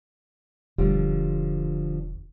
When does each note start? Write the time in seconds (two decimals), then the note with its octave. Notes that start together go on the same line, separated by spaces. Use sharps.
0.78 E1 D3 F3 G3